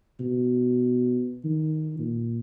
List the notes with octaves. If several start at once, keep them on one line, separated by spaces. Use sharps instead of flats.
B2
D#3
A#2